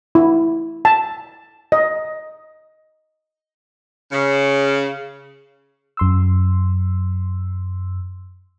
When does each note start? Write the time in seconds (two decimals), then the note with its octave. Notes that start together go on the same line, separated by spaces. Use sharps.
0.15 E4
0.85 A5
1.72 D#5
4.12 C#3
5.97 F#2 C6 E6